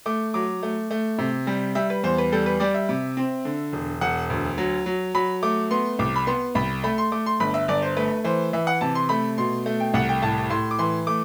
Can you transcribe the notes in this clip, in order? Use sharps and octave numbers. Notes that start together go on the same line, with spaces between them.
A3 D6
F#3 D6
A3
A3
C3
G3
G3 E5
B4
E2 C5
B4
G3 A4
B4
G3 D5
E5
C3
C4
D3
E1
E1 F#5
D2
F#3
F#3
F#3 B5
A3 D6
B3 C6
C2 D6
B5
B3 C6
C2 B5
A3 B5
C6
A3 D6
C6
G1 B5
E5
G1 D5
C5
A3 B4
E3 C5
E3 E5
F#5
C3 A5
C6
A3 B5
B2 C6
A3
G5
C2 F#5
G5
A2 A5
A2 C6
D6
E3 C6
A3 D6